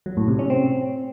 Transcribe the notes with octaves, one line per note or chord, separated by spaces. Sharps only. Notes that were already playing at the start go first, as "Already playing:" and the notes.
F#3
A2
C3
C#4
C4